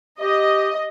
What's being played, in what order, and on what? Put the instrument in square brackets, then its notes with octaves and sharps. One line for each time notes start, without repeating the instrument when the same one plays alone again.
[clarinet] G4 [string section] D#5